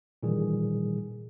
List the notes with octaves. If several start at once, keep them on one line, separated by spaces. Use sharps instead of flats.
A#2 D#3 E3 G3 G#4